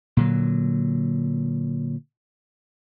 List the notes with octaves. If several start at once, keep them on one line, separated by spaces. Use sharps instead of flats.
A#2 D3 F#3